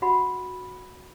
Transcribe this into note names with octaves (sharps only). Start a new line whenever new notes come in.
F#4 F#5 B5